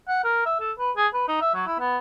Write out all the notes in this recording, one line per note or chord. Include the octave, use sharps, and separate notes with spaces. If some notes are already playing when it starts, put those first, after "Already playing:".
F#5
A#4
E5
A4
B4
G#4
B4
D#4
E5
F#3
E4
B3